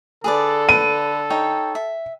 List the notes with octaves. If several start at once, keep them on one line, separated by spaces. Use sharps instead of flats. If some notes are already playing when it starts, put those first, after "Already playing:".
D3 G#4 A4 B4 D5
B4 D#7
D#4 C#5 G5
E5